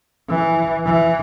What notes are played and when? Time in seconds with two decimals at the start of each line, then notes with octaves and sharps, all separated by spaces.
0.29 E3
0.86 E3